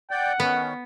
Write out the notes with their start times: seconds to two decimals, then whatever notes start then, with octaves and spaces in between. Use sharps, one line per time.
0.11 D5 F#5 G5
0.40 D#3 B3 C#4